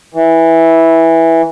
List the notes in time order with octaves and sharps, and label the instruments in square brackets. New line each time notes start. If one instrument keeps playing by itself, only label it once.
[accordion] E3